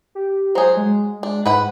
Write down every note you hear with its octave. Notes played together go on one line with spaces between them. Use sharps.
G4
F#3 G#4 C5
G#3
D4
G#2 B4 F#5 B5